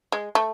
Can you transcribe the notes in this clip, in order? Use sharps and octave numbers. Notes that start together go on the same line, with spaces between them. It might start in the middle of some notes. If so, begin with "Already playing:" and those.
G#3
A3